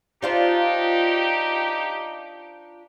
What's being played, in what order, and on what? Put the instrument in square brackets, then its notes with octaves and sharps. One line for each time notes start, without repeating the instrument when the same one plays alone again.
[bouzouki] D4 F4 C5 [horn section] D#4 G4